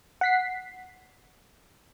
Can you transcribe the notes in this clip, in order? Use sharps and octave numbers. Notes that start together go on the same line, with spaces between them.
F#5 B6 C7